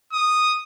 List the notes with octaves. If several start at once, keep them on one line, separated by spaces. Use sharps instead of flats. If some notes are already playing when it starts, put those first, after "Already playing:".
D#6